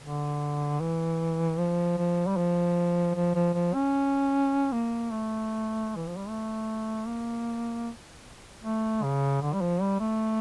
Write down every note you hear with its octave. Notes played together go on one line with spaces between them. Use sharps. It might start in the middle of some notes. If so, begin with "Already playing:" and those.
D3
E3
F3
F3
G3
F3
F3
F3
F3
C#4
A#3
A3
E3
F3
G3
A3
A#3
A3
C#3
D3
G3
F3
G3
A3